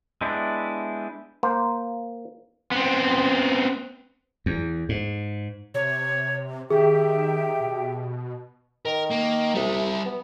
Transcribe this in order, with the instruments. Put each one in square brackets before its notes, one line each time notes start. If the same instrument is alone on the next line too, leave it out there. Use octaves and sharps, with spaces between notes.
[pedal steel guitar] G#3 B3 D4 E4 G4
[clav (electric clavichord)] A#3 C5
[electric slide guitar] B3 C4
[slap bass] E2
G#2
[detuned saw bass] C3 [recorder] C#5
[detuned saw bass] D#3 [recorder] G4 [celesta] G#4 [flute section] E5 G5
[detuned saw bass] B2
[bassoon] D#3 [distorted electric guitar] A#4
[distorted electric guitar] A#3
[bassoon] C2 [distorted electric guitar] G3 E5
[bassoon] B3